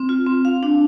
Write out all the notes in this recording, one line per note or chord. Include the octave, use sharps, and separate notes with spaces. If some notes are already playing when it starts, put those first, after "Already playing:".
Already playing: C4
F4
C4
F5
D4